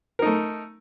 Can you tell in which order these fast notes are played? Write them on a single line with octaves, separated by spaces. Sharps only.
A#4 D#4 A3